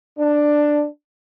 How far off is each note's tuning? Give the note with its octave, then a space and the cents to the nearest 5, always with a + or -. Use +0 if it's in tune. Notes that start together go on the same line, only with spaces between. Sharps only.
D4 +10